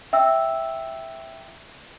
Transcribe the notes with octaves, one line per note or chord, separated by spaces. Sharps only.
E5 G5 E6